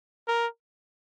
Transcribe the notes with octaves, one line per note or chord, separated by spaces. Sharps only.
A#4